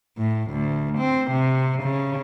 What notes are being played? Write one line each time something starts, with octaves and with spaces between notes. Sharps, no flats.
A2
D2
C4
C3
C#3